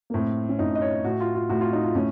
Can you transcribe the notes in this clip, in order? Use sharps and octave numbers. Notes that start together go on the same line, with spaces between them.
A#3
A2 C4
C#4
A2 D#4
D#5
C#5
A2 F#4
F4
F4
A2 F#4
F4
D#4
F4
A2 C#4